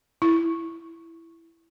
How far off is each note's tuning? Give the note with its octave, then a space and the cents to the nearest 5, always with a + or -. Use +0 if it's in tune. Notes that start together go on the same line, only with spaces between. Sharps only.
E4 +5